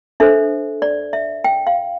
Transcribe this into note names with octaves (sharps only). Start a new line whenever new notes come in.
D4 A4 C5 E5
D5
E5
G5
F5